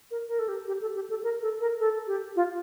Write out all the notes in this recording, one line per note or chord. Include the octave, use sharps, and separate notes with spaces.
A#4
A#4
A4
G4
G4
A4
G4
A4
A#4
A4
A#4
A4
G4
F4